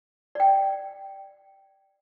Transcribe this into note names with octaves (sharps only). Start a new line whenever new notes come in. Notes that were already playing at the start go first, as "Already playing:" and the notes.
D5 G5